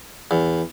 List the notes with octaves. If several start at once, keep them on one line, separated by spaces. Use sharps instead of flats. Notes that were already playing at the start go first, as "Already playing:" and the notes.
E2